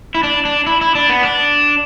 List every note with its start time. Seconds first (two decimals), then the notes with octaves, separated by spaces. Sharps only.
0.15 E4
0.23 D4
0.45 D4
0.67 E4
0.81 E4
0.95 D4
1.09 B3
1.23 D4